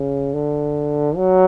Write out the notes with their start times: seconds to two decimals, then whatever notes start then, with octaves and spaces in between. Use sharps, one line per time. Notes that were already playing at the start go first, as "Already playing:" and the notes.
Already playing: C#3
0.34 D3
1.16 F#3